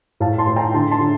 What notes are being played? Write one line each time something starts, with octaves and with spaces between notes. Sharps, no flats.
A2 F5 A5
A5 C6
A2
G5 A#5
D3 A5 C6
A5 C6
D3